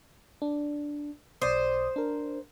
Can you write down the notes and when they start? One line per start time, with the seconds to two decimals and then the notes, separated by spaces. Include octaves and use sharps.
0.42 D4
1.42 B1 C5 D5 D#6
1.96 D4 A#4